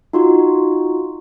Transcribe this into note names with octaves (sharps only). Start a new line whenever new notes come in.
D#4 F4 F#4